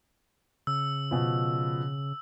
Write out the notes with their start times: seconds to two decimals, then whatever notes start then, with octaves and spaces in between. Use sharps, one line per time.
0.67 C#3 E6
1.11 B2 F3